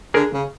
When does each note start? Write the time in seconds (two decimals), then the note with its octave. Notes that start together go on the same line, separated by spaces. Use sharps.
0.14 D3 G#4 A#4
0.34 C#3